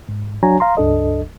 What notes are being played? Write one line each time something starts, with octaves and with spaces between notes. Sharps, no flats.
G#2
F#3 D4 F#4 C#5 G#5 A#5
F5 A#5 C6
C#2 G2 D4 A4 D#5